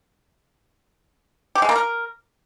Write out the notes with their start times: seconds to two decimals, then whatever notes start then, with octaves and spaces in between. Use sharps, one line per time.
1.55 G4
1.62 G#3
1.69 A#3
1.76 A#4